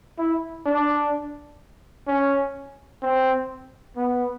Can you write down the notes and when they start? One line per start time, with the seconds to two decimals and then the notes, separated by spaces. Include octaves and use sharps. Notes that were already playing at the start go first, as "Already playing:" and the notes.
0.18 E4
0.66 D4
2.07 C#4
3.02 C4
3.96 B3